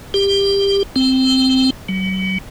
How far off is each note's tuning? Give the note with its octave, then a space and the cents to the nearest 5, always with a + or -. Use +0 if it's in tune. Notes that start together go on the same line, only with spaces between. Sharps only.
G4 +20
C4 -5
F#3 +40